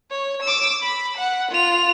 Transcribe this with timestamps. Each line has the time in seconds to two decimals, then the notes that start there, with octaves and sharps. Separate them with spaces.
0.11 C#5
0.43 D6 E6
0.83 B5
1.18 F#5
1.52 F4 F7